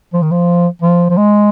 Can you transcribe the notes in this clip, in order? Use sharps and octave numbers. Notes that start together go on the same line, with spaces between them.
F3
D#3
F3
F3
F3
G#3